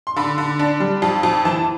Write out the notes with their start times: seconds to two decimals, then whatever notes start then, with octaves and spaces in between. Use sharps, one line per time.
0.07 C6
0.16 D3 B5
0.38 D3
0.59 D4
0.80 G3
1.02 F2
1.23 F2
1.45 E3 A5